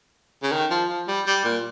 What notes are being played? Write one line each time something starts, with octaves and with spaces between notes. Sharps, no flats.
C#3
D#3
F3
F3
G3
G3
A#2